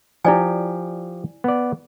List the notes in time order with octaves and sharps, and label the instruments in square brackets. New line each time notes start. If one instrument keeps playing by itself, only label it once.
[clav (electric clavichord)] F3 G4 [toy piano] E4 D5 G#5
[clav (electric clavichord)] B3 D5